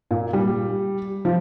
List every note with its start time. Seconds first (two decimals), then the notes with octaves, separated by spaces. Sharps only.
0.11 A#2
0.33 G3
1.25 F3